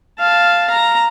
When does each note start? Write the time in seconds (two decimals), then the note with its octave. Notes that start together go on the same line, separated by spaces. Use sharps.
0.20 F5 A5
0.71 A#5